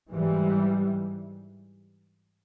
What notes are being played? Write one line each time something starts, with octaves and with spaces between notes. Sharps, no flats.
G#2 E3 G3